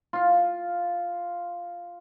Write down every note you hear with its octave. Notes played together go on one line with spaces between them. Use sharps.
F4 F5